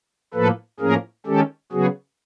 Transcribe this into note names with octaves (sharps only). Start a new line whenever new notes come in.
A2 F3 A#3 A4 B4
A2 F3 A#3 C#4 G#4 A#4
D#3 G#3 C#4 G4 A4
C#3 F#3 B3 F#4 G#4